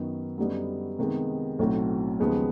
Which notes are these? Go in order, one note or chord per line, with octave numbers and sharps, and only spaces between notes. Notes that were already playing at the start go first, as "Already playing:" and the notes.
Already playing: F#2 D#3 F#3 B3 D#4
F#2 D3 G3 B3 D#4
C3 D#3 G#3 B3
B1 A2 F#3 A3 C4
D#2 C#3 F3 G#3 B3